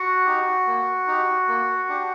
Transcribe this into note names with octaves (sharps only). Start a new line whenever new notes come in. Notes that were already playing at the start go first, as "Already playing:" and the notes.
Already playing: F#4 F#5
D#4 G4
A#3
D#4 G4
A#3
D4 G4